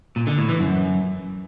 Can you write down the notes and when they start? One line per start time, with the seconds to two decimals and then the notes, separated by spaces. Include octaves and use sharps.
0.16 A#2
0.27 D3
0.38 A2
0.49 E3
0.60 F#2